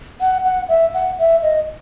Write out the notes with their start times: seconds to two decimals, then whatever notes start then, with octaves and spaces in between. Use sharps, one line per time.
0.20 F#5
0.45 F#5
0.69 E5
0.94 F#5
1.19 E5
1.42 D#5